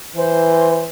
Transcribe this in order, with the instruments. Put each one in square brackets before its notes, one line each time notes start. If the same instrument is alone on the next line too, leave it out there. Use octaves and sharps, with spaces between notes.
[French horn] E3 [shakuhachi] C5